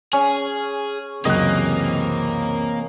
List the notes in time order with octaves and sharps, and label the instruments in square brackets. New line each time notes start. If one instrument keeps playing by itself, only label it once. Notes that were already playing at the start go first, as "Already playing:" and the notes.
[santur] C#4 [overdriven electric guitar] G#4
[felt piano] C#2 F#2 F#6 [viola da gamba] C3 E3 C4 [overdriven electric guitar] A#3 [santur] D#5